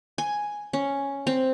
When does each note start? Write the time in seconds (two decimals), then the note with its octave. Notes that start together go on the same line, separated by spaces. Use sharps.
0.18 G#5
0.73 C#4
1.27 C4